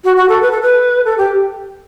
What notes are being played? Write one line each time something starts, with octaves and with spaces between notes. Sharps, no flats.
F#4
F#4
A4
B4
A4
B4
A4
G4